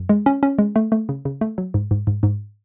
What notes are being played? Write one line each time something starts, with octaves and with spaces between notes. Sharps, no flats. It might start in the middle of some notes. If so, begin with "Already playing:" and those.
Already playing: F#2
G#3
C#4
C#4
G#3
A3
A3
C#3
C#3
A3
F#3
G#2
G#2
G#2
G#2